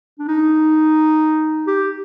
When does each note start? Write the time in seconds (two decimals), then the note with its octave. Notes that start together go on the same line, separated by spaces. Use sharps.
0.19 D4
0.28 D#4
1.67 G4